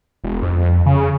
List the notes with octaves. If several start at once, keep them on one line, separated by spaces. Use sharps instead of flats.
E1
F2
C#3